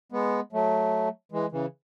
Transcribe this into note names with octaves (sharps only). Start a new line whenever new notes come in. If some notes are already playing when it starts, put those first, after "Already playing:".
G#3 B3
F#3 A3
E3 G#3
C#3 E3